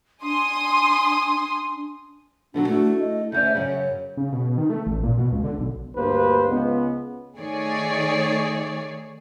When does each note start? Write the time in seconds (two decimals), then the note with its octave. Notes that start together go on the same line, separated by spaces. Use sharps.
0.23 D4 G#5 C6 D#6
2.54 B2 D3 F#3 D4 F#4
2.68 A3 E4
2.99 D#5
3.32 D2 C#4 D5 E5 G6
3.55 F#2 C#3 C#5
4.17 C#3
4.32 B2
4.45 B2
4.58 D#3
4.70 A3
4.87 A1
5.03 A#2
5.18 B2
5.32 C#2
5.44 D3
5.58 B1
5.95 D2 G2 A#3 B4 C5
6.49 C#2 G#3 B3
7.37 D#3 A3 G#4 C#5 D5